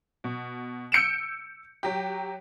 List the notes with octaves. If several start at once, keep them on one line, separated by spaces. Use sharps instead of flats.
B2
E6 G6 C#7 D7 E7
F#3 G4